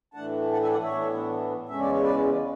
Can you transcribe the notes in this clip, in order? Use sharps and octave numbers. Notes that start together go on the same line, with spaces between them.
A2 E3 A3 D4 F#5 A5
F#5 A5
E5 G#5
D5 F#5
C#5 E5
A2 E3 B3 D4
E2 C#3 G#3 C#4 E5
D5
C#5
B4 D5